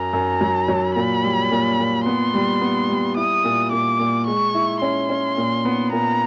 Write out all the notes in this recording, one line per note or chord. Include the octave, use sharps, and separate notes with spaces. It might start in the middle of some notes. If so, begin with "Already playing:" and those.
Already playing: F#2 A#5
F#2
F#3
F#3
A#2 B5
G3
A#2
A#2
B3 C6
G3
B3
G3
E4 D#6
A#2
A#2 D6
A#2
G#3 C#6
E4
C#4 C6
C#4
A#2
B3
A#2 A#5